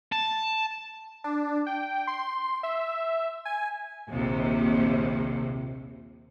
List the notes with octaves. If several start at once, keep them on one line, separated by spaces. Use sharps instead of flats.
A5
D4
G5
C6
E5
G#5
A#1 D#2 C3